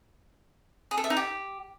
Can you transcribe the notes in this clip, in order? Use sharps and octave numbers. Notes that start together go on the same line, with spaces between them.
G#4
A4
E5
D#4
G4